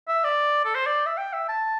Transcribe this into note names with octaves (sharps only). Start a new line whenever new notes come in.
E5
D5
A4
C5
D5
E5
G5
E5
A5